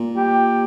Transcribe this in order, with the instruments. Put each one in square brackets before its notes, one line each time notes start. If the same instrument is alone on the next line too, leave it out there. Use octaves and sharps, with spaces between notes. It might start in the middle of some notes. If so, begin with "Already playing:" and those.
Already playing: [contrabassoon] A#2
[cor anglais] G4